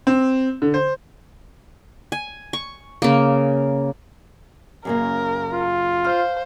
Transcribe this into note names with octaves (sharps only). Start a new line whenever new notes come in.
C4
D3
C5
G#5
C#6
C#3 A#3
F#2 C#3 A#3 A#4
F4
C5 F5 F6